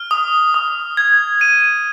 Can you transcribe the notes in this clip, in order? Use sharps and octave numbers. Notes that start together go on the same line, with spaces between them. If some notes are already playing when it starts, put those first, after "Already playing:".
Already playing: F6
D#6
D#6
G#6
D#7